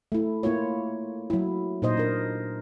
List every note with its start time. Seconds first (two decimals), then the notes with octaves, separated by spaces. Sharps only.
0.12 A3 E4
0.43 A#3 E4 F4 C#5
1.30 F#3 E4
1.82 A#2 D#4 C5 D#5
1.97 D4 A#4